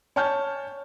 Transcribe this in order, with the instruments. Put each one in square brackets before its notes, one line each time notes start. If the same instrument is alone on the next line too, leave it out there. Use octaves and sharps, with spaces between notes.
[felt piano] C#5 G#5 A5 F6 G6